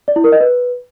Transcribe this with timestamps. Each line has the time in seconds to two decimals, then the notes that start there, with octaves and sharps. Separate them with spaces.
0.08 D5
0.16 E4
0.24 A#4
0.32 D#5
0.40 B4